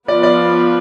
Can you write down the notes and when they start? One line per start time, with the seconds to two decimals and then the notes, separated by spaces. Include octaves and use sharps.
0.08 F3 B3 F4 B4 D5
0.23 D5